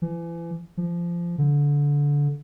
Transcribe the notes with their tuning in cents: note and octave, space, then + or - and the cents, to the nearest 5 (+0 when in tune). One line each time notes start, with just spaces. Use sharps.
E3 +35
F3 -20
D3 -20